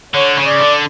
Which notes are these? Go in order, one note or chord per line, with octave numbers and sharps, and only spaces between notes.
D3 C#5
C#3
D5
D3